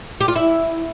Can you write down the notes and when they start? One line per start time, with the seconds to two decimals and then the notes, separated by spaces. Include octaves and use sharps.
0.21 G4
0.28 F4
0.36 E4